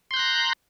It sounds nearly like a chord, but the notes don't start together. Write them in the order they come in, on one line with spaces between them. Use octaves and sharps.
C6 G6 F#6 A#5